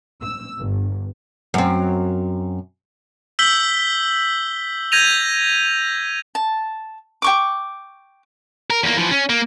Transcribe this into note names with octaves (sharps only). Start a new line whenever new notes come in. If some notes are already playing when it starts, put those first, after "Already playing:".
E6
G1
F#2 C4
E6 G6 B6 F#7 G7
G6 G#6 A#6 D#7 F7
A5
G5 C#6 D6
A#4
E2 A#3
E3 F3
C#4
A#3